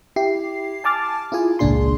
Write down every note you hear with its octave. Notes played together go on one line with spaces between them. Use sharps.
E4 G4 C7
G#5 A5 D6 F6 A6
E4 F4 G#4 G#5
G#1 C#2 A#2 D4 G#4 C6